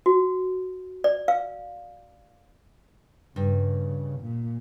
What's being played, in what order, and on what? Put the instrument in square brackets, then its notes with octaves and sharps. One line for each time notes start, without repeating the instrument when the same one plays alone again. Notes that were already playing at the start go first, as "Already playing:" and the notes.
[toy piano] F#4
D5
F5
[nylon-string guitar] G2 [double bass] C#3
[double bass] A#2